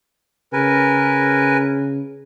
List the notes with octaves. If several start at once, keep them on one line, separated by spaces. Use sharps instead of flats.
C#3 A#4 B4 G#5